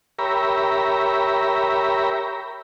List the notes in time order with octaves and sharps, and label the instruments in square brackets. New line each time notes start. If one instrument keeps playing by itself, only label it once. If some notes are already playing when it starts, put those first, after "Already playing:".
[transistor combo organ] G4 A#4 C#5 E5 A#5 B5